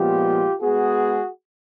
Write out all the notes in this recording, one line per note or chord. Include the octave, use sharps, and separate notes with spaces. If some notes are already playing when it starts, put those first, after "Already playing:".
Already playing: A#2 F3 G#3 B3 F4 G4
G#3 B3 F#4 G#4